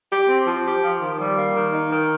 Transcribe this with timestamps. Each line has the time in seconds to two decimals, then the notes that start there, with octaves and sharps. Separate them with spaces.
0.11 G4
0.29 C4
0.47 F3
0.65 G4
0.83 F3
1.00 D#3
1.19 G3
1.37 A#3
1.55 D#3
1.73 D#4
1.92 D#3